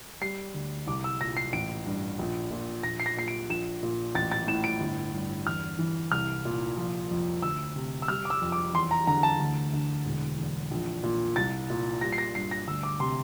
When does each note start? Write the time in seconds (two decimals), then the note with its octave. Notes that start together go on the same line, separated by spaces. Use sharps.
0.21 G3 C7
0.54 D2
0.87 C2 D6
1.04 E6
1.21 A#2 A#6
1.37 C7
1.53 A1 D7
1.86 G2
2.19 A#1
2.51 A#2
2.83 A#1 A#6
3.00 C7
3.06 A#6
3.17 A#2 C7
3.28 D7
3.49 A#1 E7
3.83 A#2
4.15 A1 A6
4.32 A6
4.47 A2 E7
4.64 D7
4.80 G1
5.14 G2
5.46 E2 F6
5.79 E3
6.11 C2 F6
6.45 A#2
6.77 F3
7.11 F2
7.42 D2 E6
7.76 C3
8.02 E6
8.08 G3 F6
8.25 D6
8.30 E6
8.41 F2
8.52 D6
8.74 E2 C6
8.91 A#5
9.07 D3 A#5
9.23 A5
9.40 D2
9.73 D3
10.05 E1
10.38 E2
10.71 A#1
11.03 A#2
11.36 C2 A6
11.70 A#2
12.01 G3 A#6
12.12 C7
12.18 A#6
12.35 G2 C7
12.51 A#6
12.68 D2 E6
12.83 D6
13.00 C3 C6